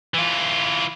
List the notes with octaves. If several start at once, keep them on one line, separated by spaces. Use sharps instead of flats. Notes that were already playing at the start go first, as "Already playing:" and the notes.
E3 F4